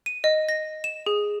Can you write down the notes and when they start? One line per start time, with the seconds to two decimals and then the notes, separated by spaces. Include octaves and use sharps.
0.06 D#7
0.24 D#5
0.49 A#6
0.84 E7
1.06 G#4